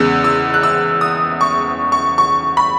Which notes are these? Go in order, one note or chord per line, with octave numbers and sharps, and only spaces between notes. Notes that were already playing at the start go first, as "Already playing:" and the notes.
Already playing: E2 C#3 G#3 B3 E6
E6
F#6
E6
D#6
C#6
C#6
C#6
B5